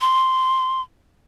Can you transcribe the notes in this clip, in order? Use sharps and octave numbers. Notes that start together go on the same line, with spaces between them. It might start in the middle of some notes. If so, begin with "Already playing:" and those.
C6